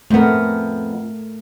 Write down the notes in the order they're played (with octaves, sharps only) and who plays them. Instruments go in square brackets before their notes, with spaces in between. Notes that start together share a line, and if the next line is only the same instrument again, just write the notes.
[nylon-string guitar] F2 B3 [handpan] A3 A#4